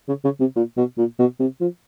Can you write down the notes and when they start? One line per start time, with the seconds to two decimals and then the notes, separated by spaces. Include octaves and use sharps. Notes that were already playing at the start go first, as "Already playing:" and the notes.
0.08 C#3
0.24 C#3
0.40 C3
0.56 A#2
0.77 B2
0.98 A#2
1.19 B2
1.40 C3
1.61 F3